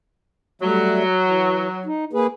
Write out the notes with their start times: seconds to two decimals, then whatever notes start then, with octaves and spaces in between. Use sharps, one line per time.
0.62 F#3 G3 A3 E5
1.23 E3
1.86 D#4
2.13 A#3 G#4 B4